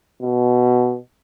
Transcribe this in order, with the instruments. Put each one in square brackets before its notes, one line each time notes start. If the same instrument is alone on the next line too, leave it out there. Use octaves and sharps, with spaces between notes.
[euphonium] B2